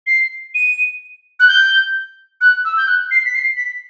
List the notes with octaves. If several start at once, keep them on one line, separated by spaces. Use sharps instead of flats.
C7
D#7
F#6
G6
F#6
E6
G6
F#6
C7
B6
C7
B6